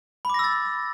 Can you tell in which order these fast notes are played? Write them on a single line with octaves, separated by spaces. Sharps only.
B5 D6 A#6 E6 A6